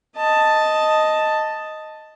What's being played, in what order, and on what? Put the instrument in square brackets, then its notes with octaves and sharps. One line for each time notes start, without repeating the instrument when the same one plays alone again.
[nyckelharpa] D#5 A5